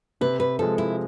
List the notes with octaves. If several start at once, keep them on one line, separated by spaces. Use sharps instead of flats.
C3 B4
B4
F3 G#3 A4
E4